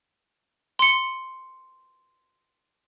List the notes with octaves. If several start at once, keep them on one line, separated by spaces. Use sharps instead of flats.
C6 C#7